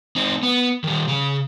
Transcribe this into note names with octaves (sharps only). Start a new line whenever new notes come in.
C4 D#4
B3
D#3 G3
C#3 F5